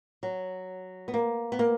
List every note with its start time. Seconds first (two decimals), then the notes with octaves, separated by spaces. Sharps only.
0.23 F#3
1.08 B3
1.14 A#3
1.52 B3
1.59 A#3